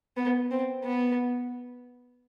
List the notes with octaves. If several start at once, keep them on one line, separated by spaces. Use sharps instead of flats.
B3
C4
B3